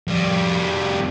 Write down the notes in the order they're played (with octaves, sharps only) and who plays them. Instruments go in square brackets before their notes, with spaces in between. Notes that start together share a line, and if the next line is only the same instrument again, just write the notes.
[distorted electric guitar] F2 G3